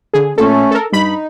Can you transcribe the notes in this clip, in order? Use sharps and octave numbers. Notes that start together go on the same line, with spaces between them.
D3 G#4
A#2 A3 C#4 A4
A4 A#4
G2 D#4 B5